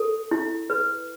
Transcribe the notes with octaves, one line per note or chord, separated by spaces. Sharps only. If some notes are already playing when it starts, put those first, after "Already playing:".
Already playing: A4
E4
B4